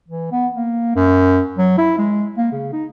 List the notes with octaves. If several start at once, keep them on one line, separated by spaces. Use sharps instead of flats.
E3
B3
A#3
F#2
F#3
E4
G#3
A#3
C#3
D#4